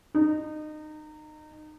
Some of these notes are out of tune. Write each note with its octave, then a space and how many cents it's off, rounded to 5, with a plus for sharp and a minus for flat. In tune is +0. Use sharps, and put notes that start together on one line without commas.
D#4 -25